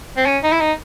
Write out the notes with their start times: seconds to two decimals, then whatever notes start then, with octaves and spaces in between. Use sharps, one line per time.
0.17 C4
0.26 C#4
0.43 D#4
0.52 E4
0.60 D#4